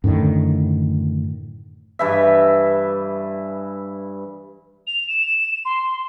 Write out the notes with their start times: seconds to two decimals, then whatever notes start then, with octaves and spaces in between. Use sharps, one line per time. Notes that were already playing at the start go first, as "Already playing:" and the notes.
0.04 F#2 A2 D3 D#3
1.99 G2 E3 E5
4.87 F7
5.07 E7
5.65 C6